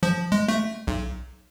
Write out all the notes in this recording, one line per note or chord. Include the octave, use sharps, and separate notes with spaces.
F3
G#3
A3
B1